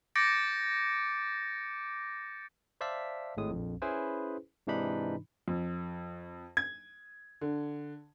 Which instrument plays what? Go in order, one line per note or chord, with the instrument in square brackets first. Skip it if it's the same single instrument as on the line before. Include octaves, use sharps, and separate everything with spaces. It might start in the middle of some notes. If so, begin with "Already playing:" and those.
[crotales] D6 G6 A6 A#6 C#7 D7
[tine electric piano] C5 D5 E5 F5 A5 B6
G#1 A2 G#3 D#6
A#1 F2
C#4 E4 G#4 B4 C5
G#2 C3 E3 D4 D#4 B5
[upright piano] F2
G#6
D3